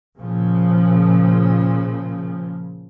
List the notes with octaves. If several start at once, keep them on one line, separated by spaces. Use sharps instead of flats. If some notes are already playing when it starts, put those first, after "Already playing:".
A#2 C#3 F3